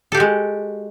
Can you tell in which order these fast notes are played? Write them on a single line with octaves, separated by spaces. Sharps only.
A4 G4 F#4 G#3